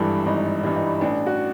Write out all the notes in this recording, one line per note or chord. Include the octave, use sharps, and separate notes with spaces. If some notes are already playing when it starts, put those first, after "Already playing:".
Already playing: G#1 G2 E3 G3 A4
G#1 D#4
G2 E3 G3
D#4
A1 D4
F#4